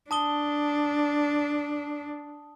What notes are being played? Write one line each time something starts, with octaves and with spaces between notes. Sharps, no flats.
D4 A5 D#6 G7